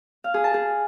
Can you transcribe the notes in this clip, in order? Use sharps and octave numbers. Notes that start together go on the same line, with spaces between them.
F5
G#4
A5
G#4